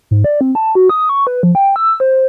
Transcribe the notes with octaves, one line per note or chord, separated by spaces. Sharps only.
G#2
D5
C4
A5
F#4
D#6
C#6
B4
F3
G5
E6
C5